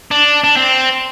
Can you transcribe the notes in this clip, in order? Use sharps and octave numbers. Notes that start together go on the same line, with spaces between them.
D4
D4
C4